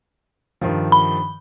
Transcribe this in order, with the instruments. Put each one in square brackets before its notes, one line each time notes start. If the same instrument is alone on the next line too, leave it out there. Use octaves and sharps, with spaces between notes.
[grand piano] G2 D#3 F3
[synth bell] B5